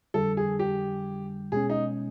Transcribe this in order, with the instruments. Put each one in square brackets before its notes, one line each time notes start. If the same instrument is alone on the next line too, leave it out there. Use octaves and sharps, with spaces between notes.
[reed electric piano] F2 D3 G3 [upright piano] A4
[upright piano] G#4
G4
[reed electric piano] B2 G#3 C#4 [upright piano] G#4
[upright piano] D#4